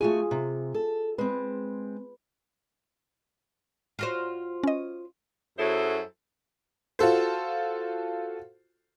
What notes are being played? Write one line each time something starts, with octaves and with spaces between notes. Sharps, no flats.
A3 F4 F#4 G#4 G#5
C3
A4
G#3 C4 B4
F4 F#4 C5
C#4 D#5
F#2 F#3 E4 G#4 A4 C5
F4 F#4 A4 C5